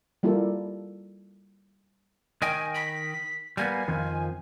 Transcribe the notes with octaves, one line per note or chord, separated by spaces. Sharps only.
G3 A#3 E4 F4 A4 A#4
D#3 D#5 G5 G#5
B6
G3 A#3 B3 G#5
F2 D#3 F3